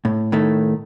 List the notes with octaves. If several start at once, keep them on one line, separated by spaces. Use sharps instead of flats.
A2
A2 D#3 A3